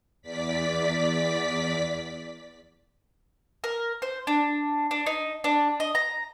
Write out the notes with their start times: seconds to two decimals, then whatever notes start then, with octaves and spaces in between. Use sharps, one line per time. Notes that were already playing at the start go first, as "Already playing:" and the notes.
0.22 E2 D5 B6
3.64 A#4
4.02 C5
4.27 D4
4.91 D4
5.06 D#4
5.44 D4
5.80 D#5
5.95 A#5